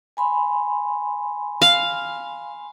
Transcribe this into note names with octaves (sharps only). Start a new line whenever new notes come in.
G#5 B5 C6
F5